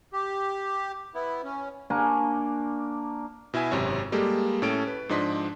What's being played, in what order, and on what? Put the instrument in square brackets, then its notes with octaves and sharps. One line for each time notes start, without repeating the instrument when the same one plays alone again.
[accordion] G4
B3 E4
C#4
[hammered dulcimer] A#3 D4 G#5 C#6
[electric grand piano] B2 E4 E5 G#5
G#1 F#2 C3 C#5
G3 G#3 A#3 G4 A4
A2 C#4 A4 D7
B4
G#2 F3 D4 D#5 C6 B6